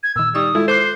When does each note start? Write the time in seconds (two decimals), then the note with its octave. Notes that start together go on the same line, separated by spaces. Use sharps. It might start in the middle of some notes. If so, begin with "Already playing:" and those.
0.03 G#6
0.16 A#2 D#3 E6
0.35 G3 D#4 C#6 D#6 E6
0.55 G#3 E4 F4 A4
0.68 A4 C5 D6 F#6 C7